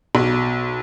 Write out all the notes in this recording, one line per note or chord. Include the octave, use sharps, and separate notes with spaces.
B1